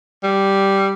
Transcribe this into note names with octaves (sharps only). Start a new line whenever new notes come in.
G3